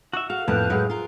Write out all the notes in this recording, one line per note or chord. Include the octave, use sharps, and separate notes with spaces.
F#4 E5 C#6
F#4 G#4 A4 F5
F2 A2 A#3 B4 A5 F#6 G6
A2 F#3 G#3 G#4
F4 A#4